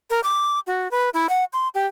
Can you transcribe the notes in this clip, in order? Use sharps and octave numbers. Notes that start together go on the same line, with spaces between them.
A#4
D6
F#4
B4
E4
F#5
C6
G4